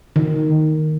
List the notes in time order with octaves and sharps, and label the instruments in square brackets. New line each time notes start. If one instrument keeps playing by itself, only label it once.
[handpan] D#3